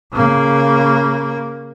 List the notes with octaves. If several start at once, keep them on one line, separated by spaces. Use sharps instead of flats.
C#3 A#3